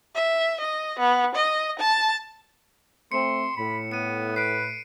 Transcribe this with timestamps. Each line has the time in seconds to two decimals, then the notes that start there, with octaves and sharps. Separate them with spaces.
0.15 E5
0.60 D#5
0.99 B3
1.35 D#5
1.80 A5
3.12 A3 C4 C6 C#7 E7
3.57 A2 B5
3.91 B3 C#7 D#7
4.36 B4 C7 D7